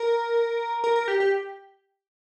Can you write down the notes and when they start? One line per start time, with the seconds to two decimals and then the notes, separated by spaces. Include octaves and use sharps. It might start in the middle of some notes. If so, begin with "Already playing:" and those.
Already playing: A#4
0.84 A#4
0.95 A#4
1.08 G4
1.20 G4